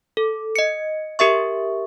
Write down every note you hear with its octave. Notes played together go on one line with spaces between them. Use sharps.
A4
D#5 C#7
G4 A#4 E5 C#6